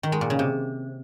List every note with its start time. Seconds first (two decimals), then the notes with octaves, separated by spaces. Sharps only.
0.03 D#3
0.12 G#3
0.21 A#2
0.30 C#3
0.39 C3